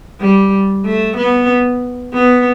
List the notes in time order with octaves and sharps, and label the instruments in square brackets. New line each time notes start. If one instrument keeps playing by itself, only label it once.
[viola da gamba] G3
A3
B3
B3